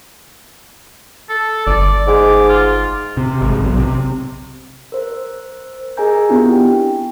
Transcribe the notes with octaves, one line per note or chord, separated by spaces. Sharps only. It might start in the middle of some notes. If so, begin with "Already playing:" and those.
A4
G1 D5
G#2 D6
F4
C3
G#1
B1
C3
A#4 C5
G#4 A#4 D#5 G#5 A#5 G6
B3 C4 D4 E4 F4 G4
G5